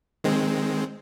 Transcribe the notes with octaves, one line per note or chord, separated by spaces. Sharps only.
D#3 G#3 C4